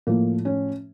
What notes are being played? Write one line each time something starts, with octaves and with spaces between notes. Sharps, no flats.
A2 F3 A#3
C#4